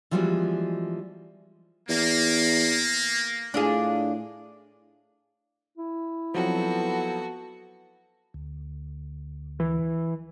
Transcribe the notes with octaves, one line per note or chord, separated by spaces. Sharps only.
E3 F3 G3 G#3 B3 F#4
E2 A#3
A2 D4 F4 G#4
E4
F3 F#3 B3 C4 F#4 A4
D2
E3